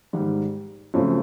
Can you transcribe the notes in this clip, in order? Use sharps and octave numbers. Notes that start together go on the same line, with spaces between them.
G#2 D#3 G3
F#2 C#3 F3 A3 C4